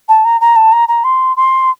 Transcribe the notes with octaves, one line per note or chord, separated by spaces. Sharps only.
A5
A#5
A#5
A5
A#5
A#5
C6
C6